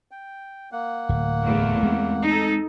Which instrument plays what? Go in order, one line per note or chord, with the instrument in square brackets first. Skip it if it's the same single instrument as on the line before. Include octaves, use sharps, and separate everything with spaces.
[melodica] G5
A#3 F#5
[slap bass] D1
[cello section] E2 A3
[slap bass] G#3 C4
[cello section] D#4 A4